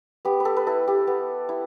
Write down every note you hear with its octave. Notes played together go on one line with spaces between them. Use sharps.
B3 G4
B4
A4
B4
E4 A4
G4
B3
E4